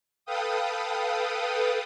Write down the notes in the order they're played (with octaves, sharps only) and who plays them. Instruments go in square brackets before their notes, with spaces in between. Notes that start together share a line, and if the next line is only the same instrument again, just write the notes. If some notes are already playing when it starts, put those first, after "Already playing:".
[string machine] A4 B4 F5 G5 D#6